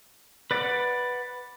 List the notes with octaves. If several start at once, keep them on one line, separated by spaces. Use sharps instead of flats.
B4 D5 F#5 B5